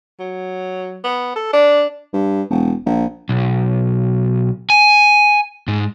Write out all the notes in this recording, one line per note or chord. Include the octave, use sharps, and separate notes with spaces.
F#3
B3
A4
D4
G2
E1
A#1
B1
G#5
G#2